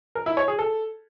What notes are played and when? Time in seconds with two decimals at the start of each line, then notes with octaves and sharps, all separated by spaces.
0.15 A#4
0.26 E4
0.37 C#5
0.48 G#4
0.59 A4